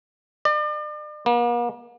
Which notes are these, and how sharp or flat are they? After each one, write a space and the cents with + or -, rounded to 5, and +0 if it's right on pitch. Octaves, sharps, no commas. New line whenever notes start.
D5 +40
A#3 +45